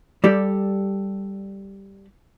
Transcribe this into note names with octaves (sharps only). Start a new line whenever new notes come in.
G3 G4 A4 D5